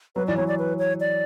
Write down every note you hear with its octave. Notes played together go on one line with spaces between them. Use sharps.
F#3 B4
E3 D5
F#3 C#5
D5
B4
C#5
D5